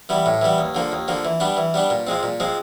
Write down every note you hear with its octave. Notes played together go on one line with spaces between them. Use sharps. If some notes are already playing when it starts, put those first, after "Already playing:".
E3 G3 B3
A2
E3 G3 B3
D#2
D3 F3 A#3
D#2
D3 F3 A#3
E3
G3 B3 D4
E3
G3 B3 D4
A#2
F3 G#3 C4
A#2
F3 G#3 C4